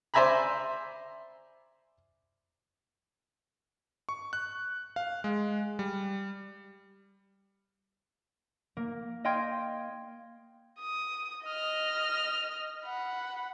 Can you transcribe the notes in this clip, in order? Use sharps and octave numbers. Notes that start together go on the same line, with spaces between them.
C5 D5 E5 G#5 A#5 B5
C#6
F#6
F5
G#3
G3
A#3
D#5 F5 G5 C6 G#6
D#6
D#5 F6
F#5 B5